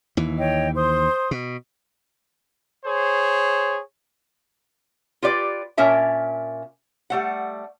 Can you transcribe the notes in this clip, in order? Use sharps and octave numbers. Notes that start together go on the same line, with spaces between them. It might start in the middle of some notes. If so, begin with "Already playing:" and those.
D#2 E3
C#5 D#5 G5
C5 C6 D#6
B2
G#4 C5 C#5
F4 G4 B4 D5
A#2 C#4 A#4 E5 A5
G3 A3 F#5